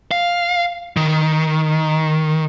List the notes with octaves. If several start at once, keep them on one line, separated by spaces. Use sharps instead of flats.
F5
D#3